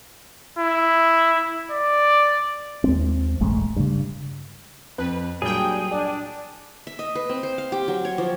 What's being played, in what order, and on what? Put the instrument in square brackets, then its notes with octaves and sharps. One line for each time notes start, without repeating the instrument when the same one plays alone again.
[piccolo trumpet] E4
D5
[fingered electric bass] D#2 G#3 C4
E1 A1 G#3 A3
G2 C#3
[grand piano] F2 [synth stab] B4
[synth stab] A#2 G3 G5 [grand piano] F#3 [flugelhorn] D4 [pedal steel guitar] G#4
[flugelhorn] D4 [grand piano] D5
[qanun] E5
D#5
B4
C4
C5
F5
G4
F#3
C#5
F3